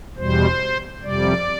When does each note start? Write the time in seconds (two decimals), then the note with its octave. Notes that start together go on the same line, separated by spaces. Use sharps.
0.16 E2 B2 G3 C5
1.03 F2 C3 G3 D5